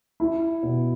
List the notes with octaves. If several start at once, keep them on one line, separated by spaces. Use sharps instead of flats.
E4
B2